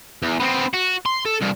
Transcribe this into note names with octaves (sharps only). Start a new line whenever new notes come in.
E2
B3 C4
F#4
C6
A4
C2 G2